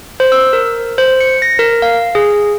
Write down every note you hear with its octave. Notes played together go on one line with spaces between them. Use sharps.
C5
E6
A#4
C5
C#7
A#6
A#4
F5
G#4